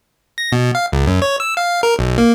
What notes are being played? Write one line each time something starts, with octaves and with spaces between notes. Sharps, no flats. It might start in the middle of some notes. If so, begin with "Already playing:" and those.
A#6
B2
F5
C#2
F#2
C#5
E6
F5
A#4
B1
A#3